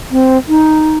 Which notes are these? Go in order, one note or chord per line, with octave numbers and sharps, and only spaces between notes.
C4
D#4